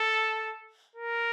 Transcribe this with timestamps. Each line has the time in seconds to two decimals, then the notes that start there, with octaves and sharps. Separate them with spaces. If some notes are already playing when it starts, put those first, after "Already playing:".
Already playing: A4
0.96 A#4